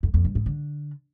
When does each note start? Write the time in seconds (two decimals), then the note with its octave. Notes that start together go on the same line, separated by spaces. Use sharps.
0.03 F2
0.14 F2
0.24 G2
0.35 G#2
0.46 D3